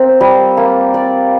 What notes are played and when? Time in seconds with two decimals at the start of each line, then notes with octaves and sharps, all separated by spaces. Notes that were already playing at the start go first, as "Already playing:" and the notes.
Already playing: A#3 C4
0.21 G3
0.57 A#3
0.94 D5